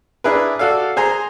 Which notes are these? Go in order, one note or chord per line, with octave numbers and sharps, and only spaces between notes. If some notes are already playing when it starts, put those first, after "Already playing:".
D4 E4 G#4 A#4 B4
F#4 A4 D5 F5
G#4 C5 G#5 A#5